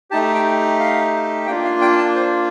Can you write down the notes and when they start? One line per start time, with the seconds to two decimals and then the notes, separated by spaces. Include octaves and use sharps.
0.11 A3 D#4 G4 A5
0.34 G5
0.80 F5
1.47 A#3 D4 F4 G5
1.64 F5
1.81 G5
1.98 A5
2.16 C5